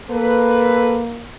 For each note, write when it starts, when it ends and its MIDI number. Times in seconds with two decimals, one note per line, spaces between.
0.11 1.29 58
0.11 1.02 69
0.11 1.02 71